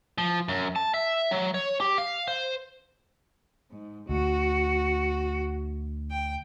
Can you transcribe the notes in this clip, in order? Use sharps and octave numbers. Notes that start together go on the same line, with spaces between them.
F3
F#2
A5
E5
F#3
C#5
G4
F5
C5
G#2
D2 F#4
G5